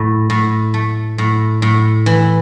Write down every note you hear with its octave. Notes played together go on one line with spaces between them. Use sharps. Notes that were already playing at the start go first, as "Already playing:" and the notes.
Already playing: A2
A2
A3
A2
A2
E3